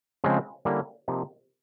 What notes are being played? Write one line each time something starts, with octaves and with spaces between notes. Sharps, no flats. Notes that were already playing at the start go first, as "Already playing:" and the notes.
C#3 F3 G#3 C4
D3 G3 A#3 C#4 E4
C3 F3 A#3 D#4